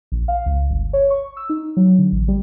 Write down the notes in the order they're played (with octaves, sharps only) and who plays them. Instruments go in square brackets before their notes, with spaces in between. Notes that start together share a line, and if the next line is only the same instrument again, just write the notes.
[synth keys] A#1
F5
C#2
G1
C#5
C#6
E6
D#4
F#3
D3
A1
G3